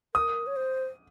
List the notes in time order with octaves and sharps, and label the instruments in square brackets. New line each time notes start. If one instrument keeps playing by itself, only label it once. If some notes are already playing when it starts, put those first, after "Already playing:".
[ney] A#4 [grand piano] D#6
[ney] C#5
C5